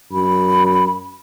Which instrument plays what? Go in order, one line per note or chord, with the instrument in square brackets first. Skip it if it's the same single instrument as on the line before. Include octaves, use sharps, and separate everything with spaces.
[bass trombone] F#2 [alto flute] B5